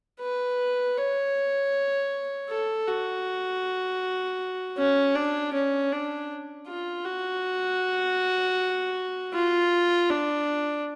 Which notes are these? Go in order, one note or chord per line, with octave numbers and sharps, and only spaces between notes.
B4
C#5
A4
F#4
C#4
D4
C#4
D4
F4
F#4
F4
D4